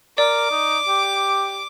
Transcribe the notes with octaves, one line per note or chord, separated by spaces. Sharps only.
A#4 D5 D6
D#4
G4